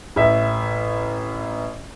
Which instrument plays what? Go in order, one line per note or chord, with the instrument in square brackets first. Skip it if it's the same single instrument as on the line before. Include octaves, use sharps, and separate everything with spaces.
[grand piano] A1 E5